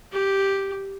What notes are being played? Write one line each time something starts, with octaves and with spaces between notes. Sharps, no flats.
G4